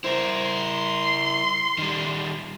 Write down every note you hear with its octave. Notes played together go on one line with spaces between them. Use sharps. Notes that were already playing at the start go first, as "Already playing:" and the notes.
E4 A#4 C5
C6
D#3 G3